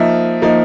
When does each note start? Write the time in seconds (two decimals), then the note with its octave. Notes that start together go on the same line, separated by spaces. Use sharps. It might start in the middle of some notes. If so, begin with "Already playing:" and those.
Already playing: F3 A#3 D#4 E5
0.42 F3 A#3 D#4